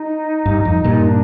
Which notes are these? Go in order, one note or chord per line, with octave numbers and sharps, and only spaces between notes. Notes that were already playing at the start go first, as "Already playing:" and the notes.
Already playing: D#4
G2
F2
G2 A#2
D4